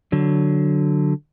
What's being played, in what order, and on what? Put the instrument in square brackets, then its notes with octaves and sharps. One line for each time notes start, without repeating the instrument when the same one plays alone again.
[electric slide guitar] D3 F#3